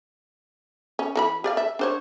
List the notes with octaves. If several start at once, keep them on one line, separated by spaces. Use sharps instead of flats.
C#4
E3 A4 B5
G4 D5 F5
E5
D4 C5 C#5